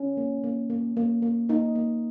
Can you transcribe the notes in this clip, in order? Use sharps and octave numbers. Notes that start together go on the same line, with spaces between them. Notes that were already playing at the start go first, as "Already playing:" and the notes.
Already playing: C#4
A#3
A#3
A#3
A#3
A#3
A#3 D#4
A#3